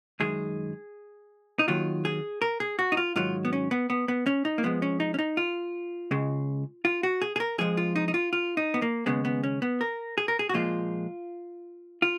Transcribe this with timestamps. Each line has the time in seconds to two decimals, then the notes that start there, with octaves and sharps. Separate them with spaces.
0.20 F#2 D#3 G#3 G#4
1.59 D#4
1.68 D#2 D#3 F#3 F4
2.05 G#4
2.42 A#4
2.60 G#4
2.79 F#4
2.92 D#4
2.97 F4
3.16 G#2 D#3 F#3 F4
3.45 B3
3.53 C#4
3.71 B3
3.90 B3
4.08 B3
4.26 C#4
4.45 D#4
4.58 A#3
4.63 F2 F3 G#3 B3
4.82 C#4
5.00 D#4
5.14 C#4
5.19 D#4
5.37 F4
6.11 C#2 C#3 G#3
6.85 F4
7.03 F#4
7.22 G#4
7.36 G#4
7.40 A#4
7.58 F2 F3 G#3 G#4
7.77 F4
7.96 D#4
8.08 D#4
8.14 F4
8.33 F4
8.57 D#4
8.74 B3
8.82 A#3
9.06 D#2 C#3 G#3 B3
9.25 B3
9.44 C#4
9.62 B3
9.81 A#4
10.18 G#4
10.28 A#4
10.39 G#4
10.49 F#4
10.54 A#2 F3 G#3 F4
12.02 F4